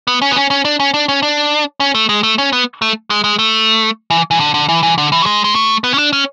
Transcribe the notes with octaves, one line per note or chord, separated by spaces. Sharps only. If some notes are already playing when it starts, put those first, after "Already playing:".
B3
C#4
B3
C#4
C#4
D4
C#4
D4
C#4
D4
C#4
A3
G#3
A3
C#4
B3
A3
G#3
G#3
A3
E3
E3
D3
D3
E3
E3
D3
E3
F#3
G#3
G#3
A3
B3
C#4
D4
C#4